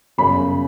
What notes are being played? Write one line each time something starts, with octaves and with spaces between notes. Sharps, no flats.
G1 F#2 C#3 B5